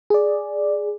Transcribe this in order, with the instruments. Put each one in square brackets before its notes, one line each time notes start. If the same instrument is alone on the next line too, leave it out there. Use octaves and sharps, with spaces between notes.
[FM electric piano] G#4 D5